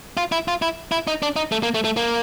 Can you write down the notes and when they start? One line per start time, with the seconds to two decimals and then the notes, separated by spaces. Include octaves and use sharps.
0.17 F4
0.32 E4
0.48 F4
0.62 E4
0.92 E4
1.07 D#4
1.22 D4
1.36 D#4
1.52 A3
1.63 A#3
1.74 A3
1.84 A3
1.97 A#3